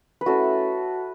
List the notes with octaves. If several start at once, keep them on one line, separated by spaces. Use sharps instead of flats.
B4
A3 C#4 E4 F#4 A4